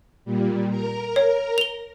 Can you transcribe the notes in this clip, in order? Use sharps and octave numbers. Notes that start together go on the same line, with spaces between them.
A#2 G3
A#4 A#5
C#5
F7 G7